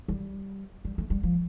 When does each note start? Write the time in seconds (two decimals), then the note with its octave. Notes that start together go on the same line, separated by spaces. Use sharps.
0.08 G3
0.85 G3
0.98 A3
1.10 G3
1.23 F3